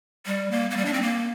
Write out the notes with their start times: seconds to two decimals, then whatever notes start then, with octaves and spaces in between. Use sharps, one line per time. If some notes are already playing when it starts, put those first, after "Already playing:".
0.26 G3
0.51 A#3
0.70 A#3
0.77 G3
0.85 D4
0.93 C4
1.02 A#3